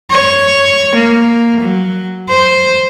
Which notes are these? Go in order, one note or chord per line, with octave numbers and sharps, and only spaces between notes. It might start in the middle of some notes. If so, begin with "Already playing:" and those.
C#5
A#3
F#3
C5